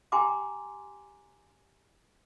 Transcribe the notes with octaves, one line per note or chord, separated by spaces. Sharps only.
G4 G5 G#5 A#5 C6 D6